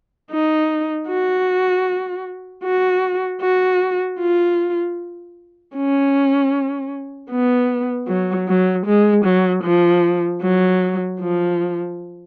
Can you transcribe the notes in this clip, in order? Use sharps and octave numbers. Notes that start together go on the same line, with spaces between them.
D#4
F#4
F#4
F#4
F4
C#4
B3
F#3
F#3
G#3
F#3
F3
F#3
F3